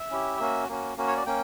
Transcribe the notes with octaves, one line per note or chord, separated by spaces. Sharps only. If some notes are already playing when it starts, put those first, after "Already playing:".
Already playing: E5
C#4 E4 G4
A#3 C#4 F#4
A#3 C#4 F#4
A#3 C#4 F#4
C#5
D5
A#3 C#4 G5